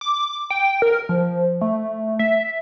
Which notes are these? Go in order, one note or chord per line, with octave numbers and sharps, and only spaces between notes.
D6
G5
A#4
F3
A3
E5